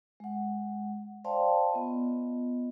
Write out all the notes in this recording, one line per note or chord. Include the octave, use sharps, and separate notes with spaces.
G#3 F#5
C5 D5 F5 G5 A5 C6
B3 F4 D#5